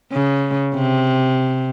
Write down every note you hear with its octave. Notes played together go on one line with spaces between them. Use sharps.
C#3
C3